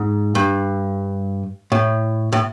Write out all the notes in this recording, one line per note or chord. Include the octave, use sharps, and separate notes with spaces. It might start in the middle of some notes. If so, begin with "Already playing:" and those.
Already playing: G#2
G2
A2
A2